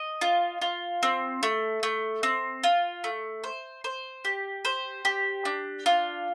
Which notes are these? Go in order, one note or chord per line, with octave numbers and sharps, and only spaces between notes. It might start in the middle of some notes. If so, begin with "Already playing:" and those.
Already playing: D#5
F4
F4
C4
A3
A3
C4
F4
A3
C5
C5
G4
C5
G4
D4
F4